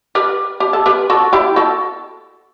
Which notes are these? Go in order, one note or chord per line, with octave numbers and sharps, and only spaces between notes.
G4 B4
G4
A4
G4 B4
F#4 A4
E4 G4
F#4 A4